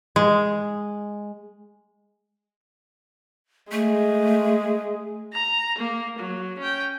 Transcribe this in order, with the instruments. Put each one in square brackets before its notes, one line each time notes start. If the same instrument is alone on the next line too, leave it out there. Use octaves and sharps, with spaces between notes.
[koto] G#3
[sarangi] G#3 [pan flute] A3
[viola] A#5
A#3
F#3
C#4 G5